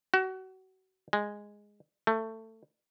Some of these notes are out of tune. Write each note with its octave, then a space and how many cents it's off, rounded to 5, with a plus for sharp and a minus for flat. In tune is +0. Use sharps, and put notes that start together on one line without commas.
F#4 +30
G#3 -5
A3 +20